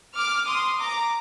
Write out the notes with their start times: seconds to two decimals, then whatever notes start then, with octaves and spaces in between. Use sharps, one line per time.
0.16 D6 F6
0.47 C6 D#6
0.79 A#5 D6